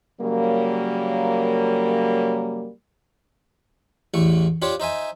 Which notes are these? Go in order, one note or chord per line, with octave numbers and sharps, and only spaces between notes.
C#3 F#3 G3 A#3
A1 E2 A3 C#6
D4 F4 G4 C5 C#5
D#4 C5 E5 G#5